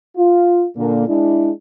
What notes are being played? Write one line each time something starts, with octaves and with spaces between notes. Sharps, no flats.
F4
A#2 D3 A#3
G#3 D4 E4